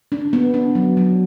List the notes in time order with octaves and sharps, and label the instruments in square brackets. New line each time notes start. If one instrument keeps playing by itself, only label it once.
[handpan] D4
B3
D4
F#3
F#3